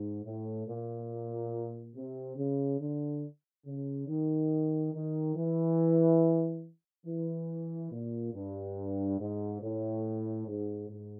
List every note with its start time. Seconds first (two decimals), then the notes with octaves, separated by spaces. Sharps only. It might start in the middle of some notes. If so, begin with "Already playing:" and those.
Already playing: G#2
0.24 A2
0.67 A#2
1.95 C3
2.37 C#3
2.80 D3
3.66 C#3
4.08 D#3
4.93 D#3
5.36 E3
7.06 E3
7.92 A#2
8.34 G2
9.20 G#2
9.62 A2
10.48 G#2
10.90 G#2